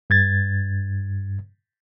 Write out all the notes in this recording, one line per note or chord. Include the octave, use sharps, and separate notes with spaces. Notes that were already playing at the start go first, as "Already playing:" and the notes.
G2 G#6 A6